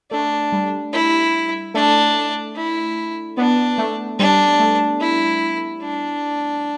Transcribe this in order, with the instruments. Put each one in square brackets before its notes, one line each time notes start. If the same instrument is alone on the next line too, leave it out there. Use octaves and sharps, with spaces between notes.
[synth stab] A3 [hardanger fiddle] D4
[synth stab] G3
[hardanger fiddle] E4
[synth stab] A3 [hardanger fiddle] D4
[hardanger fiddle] E4
[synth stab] B3 [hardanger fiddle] D4
[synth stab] A3
[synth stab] G3 [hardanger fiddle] D4
[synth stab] A3
[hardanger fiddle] E4
D4